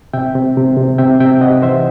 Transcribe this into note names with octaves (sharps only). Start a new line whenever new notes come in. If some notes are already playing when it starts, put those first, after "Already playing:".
C3 E5 G5
C3
C3
C3
C3 E5 G5
C3 E5 G5
C3 D#5 F#5
E3 C5 E5